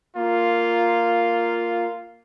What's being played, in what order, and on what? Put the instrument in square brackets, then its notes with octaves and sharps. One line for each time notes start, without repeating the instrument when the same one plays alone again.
[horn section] A#3 F4